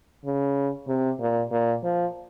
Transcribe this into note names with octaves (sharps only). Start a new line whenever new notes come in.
C#3
C3
A#2
A#2
F3